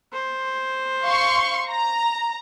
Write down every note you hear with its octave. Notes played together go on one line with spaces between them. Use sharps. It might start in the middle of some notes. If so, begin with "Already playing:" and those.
C5
F5 C6 C#6
A#5